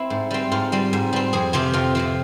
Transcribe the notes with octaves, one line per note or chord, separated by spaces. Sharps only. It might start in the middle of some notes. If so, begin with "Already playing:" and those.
Already playing: C4 E4
G#2
G3 C4
G#2 F4
G3 C4
G#2
G3 C4
F2 G#4
C3 F3 C4 G4
F2 F4
C3 F3 C4